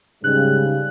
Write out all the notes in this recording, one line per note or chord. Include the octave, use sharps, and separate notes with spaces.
G#2 C#3 G3 F#6